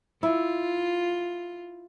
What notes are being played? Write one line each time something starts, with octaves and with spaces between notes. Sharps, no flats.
E4 F4